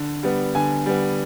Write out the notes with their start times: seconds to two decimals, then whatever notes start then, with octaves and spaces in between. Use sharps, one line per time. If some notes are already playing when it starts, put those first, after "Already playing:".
Already playing: D3
0.23 G3 B3
0.55 D3 G#5
0.86 G3 B3